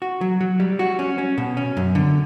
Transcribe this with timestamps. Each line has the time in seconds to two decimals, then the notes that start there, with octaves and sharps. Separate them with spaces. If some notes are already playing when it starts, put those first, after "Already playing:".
0.02 F#4
0.21 F#3
0.41 F#3
0.60 G3
0.79 F#4
0.99 C#4
1.18 C#4
1.38 B2
1.57 C#4
1.77 F#2
1.95 D3